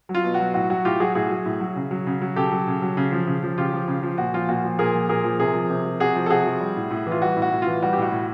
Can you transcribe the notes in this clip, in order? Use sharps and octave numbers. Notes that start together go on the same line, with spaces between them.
F#3
F4
B2
F#4
F#3
A2 F#4
F#3 F#4
A2 F4 G4
F#3 F#4 G#4
A2 F#4 G#4
F#3
A2
F#3
C#3
F#3
C#3
F#3
C#3 G4 A4
F#3
C#3
F#3
C#3
F3
C#3
F3
C#3 F4 G4
F3
C#3
F3
A#2 F#4
F3 F4
A#2 F#4
F3
A#2 G#4 A#4
F3
A#2 G#4 A#4
F3
C3 G#4 A#4
F3
C3
F3
C3 F#4 G#4
F3
A4
C3 F#4 G#4
F3
G3
A2
A2
E3
F4
G3 F#4
A2
F#4
A2
E3 F4
G3 F#4
G4
A2 F#4
A2